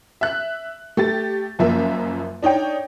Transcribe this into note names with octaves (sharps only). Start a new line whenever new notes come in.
E5 F#6
A3 G4 A6
F#1 F#2 F3 A#3 E5
D4 D#4 C#5 G5